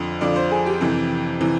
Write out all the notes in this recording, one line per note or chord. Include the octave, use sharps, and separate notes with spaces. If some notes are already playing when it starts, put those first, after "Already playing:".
Already playing: F2 D3 F3
F2 D3 F3 D5
C5
G#4
G4
F2 C3 E3
C3 E3